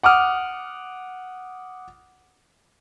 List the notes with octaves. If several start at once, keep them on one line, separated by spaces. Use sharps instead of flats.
F#5 D6 D#6 F6